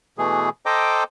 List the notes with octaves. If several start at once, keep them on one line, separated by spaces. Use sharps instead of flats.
B2 E3 A3 G#4
A4 C5 D#5 G5 A#5 D6